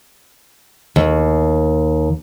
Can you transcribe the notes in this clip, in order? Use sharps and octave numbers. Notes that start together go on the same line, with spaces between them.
D#2